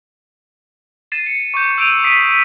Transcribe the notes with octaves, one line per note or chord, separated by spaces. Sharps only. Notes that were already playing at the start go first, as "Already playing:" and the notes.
A6 C7 D#7 E7
C#7
C#6 D6 G6
E6 G6 D7 D#7 F7
D#6 B6 C7 D7 D#7